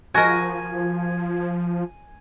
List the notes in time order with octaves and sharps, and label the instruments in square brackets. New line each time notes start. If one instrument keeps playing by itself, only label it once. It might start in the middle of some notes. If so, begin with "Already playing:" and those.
[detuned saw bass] F3 [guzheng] F#4 A#4 [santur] G#5